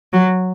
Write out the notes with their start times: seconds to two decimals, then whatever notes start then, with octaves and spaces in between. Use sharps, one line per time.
0.13 F#3